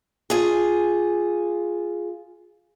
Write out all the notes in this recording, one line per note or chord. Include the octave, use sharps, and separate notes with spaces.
F4 G#4